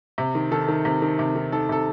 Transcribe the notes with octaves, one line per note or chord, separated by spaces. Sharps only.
C3
D#3
D#3 A4
D#3
C3
D#3
C3
D#3
D#3 A4
C3 A4